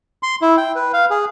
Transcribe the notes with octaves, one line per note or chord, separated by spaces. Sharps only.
C6
E4
G5
B4
F5
G#4